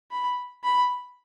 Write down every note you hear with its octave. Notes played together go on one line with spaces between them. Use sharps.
B5
B5